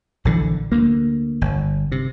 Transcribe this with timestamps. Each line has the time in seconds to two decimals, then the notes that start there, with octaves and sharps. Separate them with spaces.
0.25 A#1 D3 E3
0.72 D2 A#3
1.41 G1
1.92 C3